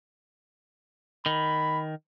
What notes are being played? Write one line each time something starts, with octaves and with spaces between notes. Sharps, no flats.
D#3 B5